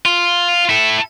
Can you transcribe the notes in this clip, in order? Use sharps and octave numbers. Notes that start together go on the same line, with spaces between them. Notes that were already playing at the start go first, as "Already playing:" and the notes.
F4
E4 A4